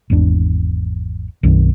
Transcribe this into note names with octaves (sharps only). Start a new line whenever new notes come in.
G#1 E2 D4
B1 F#2 D#3 C4